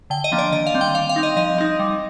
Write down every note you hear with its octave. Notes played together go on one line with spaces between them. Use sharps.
D3 G5
D#5
F3 A#3 D4
D5
D#3 D#5
F5
G3 C4
G5
G3 F5
F5
C4 D#4
D#5
F3 D#5
C4 D#4
G3